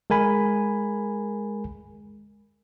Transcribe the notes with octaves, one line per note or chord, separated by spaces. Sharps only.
G#3 A#4 G#5 B5